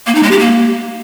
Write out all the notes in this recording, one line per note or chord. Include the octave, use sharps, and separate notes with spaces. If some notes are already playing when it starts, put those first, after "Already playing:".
A#3
D#4
G#3
G4
A#3